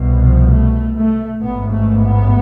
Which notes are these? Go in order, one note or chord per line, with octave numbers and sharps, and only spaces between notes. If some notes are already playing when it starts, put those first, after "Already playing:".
Already playing: C2 B2
F3
A3
A3
A1 G#2 B3
A3
B3